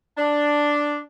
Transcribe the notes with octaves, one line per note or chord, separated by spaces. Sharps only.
D4